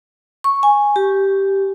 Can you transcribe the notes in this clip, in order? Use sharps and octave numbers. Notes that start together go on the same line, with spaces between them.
C#6
G#5
G4